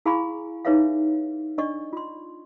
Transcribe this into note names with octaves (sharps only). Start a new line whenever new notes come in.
E4 G#4 F5 G#5 B5 C#6
D#4 G#4 B4 C#5 E5 F5
D4 D5 D#5 C#6
F4 C6